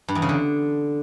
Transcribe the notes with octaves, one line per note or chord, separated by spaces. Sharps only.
G2
E2
C#3
D3